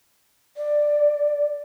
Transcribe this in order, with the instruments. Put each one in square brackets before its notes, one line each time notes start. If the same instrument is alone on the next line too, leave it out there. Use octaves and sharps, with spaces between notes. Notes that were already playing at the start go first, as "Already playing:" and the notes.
[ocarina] D5